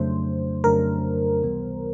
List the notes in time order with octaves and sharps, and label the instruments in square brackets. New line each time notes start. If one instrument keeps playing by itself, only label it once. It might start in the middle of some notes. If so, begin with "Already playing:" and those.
Already playing: [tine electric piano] F2 C#3 F#3 A3 D4 [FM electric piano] C5
[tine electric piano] F2 C#3 F#3 A3 D4 [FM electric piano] A#4
[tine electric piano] C#2 C3 E3 G3 B3